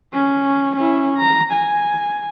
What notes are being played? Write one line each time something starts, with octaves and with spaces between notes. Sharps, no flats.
C#4
C#4 E4
A#5
G#5